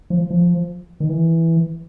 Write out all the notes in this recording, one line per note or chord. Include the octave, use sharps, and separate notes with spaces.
F3
F3
D#3
E3